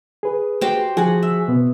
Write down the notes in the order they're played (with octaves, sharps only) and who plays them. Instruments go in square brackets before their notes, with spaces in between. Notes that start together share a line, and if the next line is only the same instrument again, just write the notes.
[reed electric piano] G#4 B4
[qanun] F#4 G4 C5
[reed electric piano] F3 G#4 G#5 [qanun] F#4 F#5
[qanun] E5
[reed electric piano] B2 B3